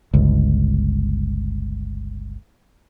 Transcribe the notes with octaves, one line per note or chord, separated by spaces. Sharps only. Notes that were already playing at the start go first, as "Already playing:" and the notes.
G1 C#2